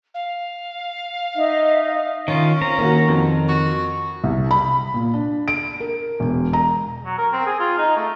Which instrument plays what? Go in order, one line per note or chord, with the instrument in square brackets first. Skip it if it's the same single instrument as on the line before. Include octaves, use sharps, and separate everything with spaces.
[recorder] F5
[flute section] D#4 D#5 E5
[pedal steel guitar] D#3 F4 [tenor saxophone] C#4
[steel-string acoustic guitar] C4 [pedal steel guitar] A#5
[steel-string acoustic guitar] D#3 [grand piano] A#3 F#4
[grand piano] F2
[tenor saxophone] F#4
[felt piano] C2
B5
A#2
D4
D7
A#4
E1
A#5
[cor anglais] F#3
A#4
C4
G#4
F4
D#4
A3